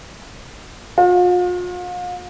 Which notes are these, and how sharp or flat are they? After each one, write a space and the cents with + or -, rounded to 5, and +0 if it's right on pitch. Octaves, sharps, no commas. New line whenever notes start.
F4 +45